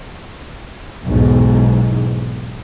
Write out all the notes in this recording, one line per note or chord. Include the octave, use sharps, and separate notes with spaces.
B1 E2 G#2